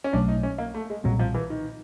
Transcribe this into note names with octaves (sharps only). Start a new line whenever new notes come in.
C#4
B1 B2 F#3 A3 D4
D#4
C#4
A#3
A3
G#3
B1 A#2 F#3 G3 C4
F3
E3
D#3